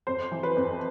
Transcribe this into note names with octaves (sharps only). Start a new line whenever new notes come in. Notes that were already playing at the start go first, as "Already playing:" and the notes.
F2 C5
E3
B4
F2